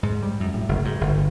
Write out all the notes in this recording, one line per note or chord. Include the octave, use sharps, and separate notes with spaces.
G#2
G3
F#2
A2
F#1
G#2
G1